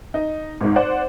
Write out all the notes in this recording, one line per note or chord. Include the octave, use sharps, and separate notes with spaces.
D#4
G#1 G#2
C5 D5 F#5